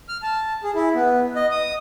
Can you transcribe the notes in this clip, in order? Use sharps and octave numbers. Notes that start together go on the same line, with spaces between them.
F6
A5
G#4
E4
B3
D#5
D#6